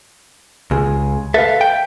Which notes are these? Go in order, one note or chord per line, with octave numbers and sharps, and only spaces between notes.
C#2 G#4
A4 B4 E5 F5
G5